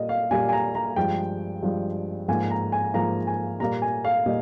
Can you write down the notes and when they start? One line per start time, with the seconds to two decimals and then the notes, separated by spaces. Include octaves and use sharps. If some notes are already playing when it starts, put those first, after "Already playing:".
Already playing: A#2 G3 A#3 D#5
0.09 F5
0.31 A#2 G3 A#3 G#5
0.49 G#5
0.53 A#5
0.75 A#5
0.96 G2 F3 G#3 G5
1.63 G2 F3 G#3
2.28 G#2 F3 A#3 G#5
2.50 A#5
2.72 G#5
2.94 G#2 F3 A#3 A#5
3.27 G#5
3.60 A#2 G3 A#3 A#5
3.82 G#5
4.05 F5
4.26 A#2 G3 A#3 D#5